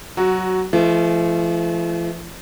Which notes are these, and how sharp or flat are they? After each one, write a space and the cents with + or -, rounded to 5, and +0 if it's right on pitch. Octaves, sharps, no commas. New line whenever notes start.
F#3 +15 F#4 +0
F3 -45 A3 -30